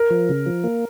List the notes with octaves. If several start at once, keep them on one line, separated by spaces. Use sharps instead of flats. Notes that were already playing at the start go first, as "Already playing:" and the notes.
Already playing: A#4
F3
C#3
F3
A#3